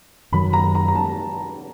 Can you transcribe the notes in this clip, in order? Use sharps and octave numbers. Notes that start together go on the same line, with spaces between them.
F#2 D#3 F#3 B5
A#5
A#5
A#5
A5